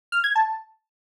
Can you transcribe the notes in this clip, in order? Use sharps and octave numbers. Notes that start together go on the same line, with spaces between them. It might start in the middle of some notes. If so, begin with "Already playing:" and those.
F6
G#6
A5